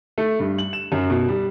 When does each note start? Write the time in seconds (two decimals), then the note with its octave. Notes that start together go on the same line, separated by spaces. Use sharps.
0.18 A3
0.40 G2
0.58 F#7
0.73 E7
0.92 F#2
1.10 B2
1.28 G3